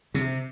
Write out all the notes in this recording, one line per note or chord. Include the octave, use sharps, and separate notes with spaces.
C3